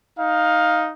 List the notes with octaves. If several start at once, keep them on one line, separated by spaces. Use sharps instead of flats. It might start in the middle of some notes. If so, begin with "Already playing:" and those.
D#4 F5